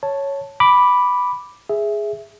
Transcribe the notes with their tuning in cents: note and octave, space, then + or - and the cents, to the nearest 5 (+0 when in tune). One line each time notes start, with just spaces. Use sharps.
C#5 +0 A5 +0
B5 +0 D6 +0
G#4 +0 E5 +0